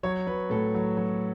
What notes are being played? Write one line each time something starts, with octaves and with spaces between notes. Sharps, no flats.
F#3 C#5
F#3 B4
A2 A4
F#3
F#3